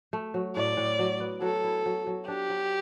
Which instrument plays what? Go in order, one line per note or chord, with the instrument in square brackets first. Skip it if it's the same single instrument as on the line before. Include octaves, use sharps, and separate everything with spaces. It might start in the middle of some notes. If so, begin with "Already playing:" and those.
[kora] A3
F#3
[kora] A2 [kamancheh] D5
[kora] A2
F#3
B3
[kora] F#3 [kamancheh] A4
[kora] E4
F#3
F#3
[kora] D4 [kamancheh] G4
[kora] F#3